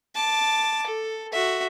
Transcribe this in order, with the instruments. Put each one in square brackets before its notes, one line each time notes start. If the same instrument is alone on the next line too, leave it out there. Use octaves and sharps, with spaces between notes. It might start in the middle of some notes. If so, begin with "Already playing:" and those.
[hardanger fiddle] A5 D6
A4
F#4 E5